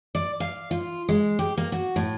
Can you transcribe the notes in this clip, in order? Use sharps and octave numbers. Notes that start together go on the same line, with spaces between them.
D5
F5
F4
G#3
G4
A#3
F#4
A2